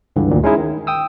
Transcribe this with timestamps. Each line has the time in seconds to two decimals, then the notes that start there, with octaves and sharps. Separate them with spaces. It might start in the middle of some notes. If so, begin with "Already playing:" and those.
0.16 C#2 G2 D3 E3
0.31 D2 A#2 D#3
0.43 G#3 C#4 D#4 E4 G#4
0.58 D#3
0.87 G5 D#6 E6